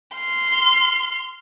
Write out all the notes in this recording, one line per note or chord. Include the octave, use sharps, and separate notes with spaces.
C6 F6